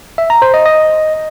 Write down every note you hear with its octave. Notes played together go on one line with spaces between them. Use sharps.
E5
A#5
C5
D#5
D#5